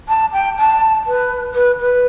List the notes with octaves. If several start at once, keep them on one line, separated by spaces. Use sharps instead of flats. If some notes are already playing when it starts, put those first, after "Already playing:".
A5
G5
A5
B4
B4
B4